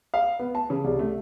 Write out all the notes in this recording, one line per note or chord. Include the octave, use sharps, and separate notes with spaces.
F5
B3
A5
C#3
C2
A3